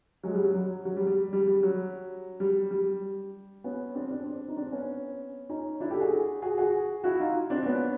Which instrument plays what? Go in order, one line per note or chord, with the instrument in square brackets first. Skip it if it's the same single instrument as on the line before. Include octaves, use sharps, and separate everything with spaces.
[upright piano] F#3 G#3
G3
F#3
F#3
F#3
G3
G3
G3
G3
F#3
G3
G3
B3 C#4
C4 D4
C4 D4
C4 D4
D#4
C4 D4
B3 C#4
C#4 D#4
D4 E4
G4 A4
F#4 G#4
F#4 G#4
F#4 G#4
E4 F#4
D#4 F4
C4 D4
B3 C#4